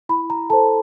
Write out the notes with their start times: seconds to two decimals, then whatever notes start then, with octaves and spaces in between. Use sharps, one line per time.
0.09 E4 B5
0.30 A#5
0.50 A4 C5 A5